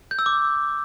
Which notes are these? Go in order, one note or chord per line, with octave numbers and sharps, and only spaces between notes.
G6
E6
D6